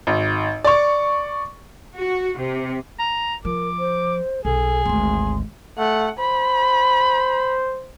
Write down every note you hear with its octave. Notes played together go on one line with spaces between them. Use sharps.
G#1
D5 C#6
F#4
C3
A#5
F3 A#4 D6
C5
B1 G#4 A4
G#1 D2 C6
A3 F#5
C5 B5